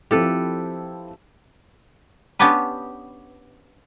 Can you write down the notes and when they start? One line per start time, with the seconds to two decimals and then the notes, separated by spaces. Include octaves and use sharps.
0.11 F3 C4 E4 G4 A4 B4
2.39 B3 C#4 D4 G4 B4